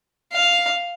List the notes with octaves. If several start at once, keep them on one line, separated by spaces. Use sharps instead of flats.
F5